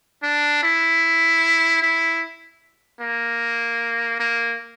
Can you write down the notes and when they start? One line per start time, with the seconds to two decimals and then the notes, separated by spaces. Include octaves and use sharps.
0.23 D4
0.63 E4
1.82 E4
3.00 A#3
4.19 A#3